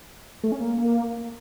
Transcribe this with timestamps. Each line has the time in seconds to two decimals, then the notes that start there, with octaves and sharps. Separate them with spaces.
0.44 A3
0.52 C#4
0.60 A#3